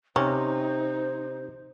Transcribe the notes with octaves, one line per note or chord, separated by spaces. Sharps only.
C3 C#4 D#4 C5